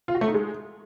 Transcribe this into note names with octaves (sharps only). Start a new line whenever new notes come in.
F4
F#4
A3
D#4
G#3